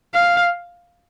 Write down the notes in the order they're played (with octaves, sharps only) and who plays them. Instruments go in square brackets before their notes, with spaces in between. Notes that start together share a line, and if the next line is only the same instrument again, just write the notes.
[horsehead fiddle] F5